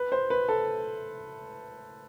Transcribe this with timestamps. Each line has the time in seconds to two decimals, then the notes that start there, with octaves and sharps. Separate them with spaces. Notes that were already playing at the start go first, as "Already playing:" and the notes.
Already playing: B4
0.12 C5
0.30 B4
0.49 A4